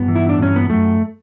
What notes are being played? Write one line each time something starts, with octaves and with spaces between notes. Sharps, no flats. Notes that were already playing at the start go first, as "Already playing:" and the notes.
Already playing: G2 B3
E3
E4
D4
G2 C#4
B3
F#2 A3